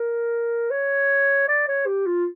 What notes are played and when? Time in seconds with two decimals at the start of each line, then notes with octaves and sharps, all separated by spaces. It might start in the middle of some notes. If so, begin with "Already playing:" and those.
Already playing: A#4
0.71 C#5
1.48 D5
1.68 C#5
1.86 G4
2.06 F4